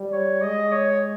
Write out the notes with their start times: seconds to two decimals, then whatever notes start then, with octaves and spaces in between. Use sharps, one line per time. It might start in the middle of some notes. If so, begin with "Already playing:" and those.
Already playing: G3
0.12 C#5
0.42 G#3 D#5
0.72 C#5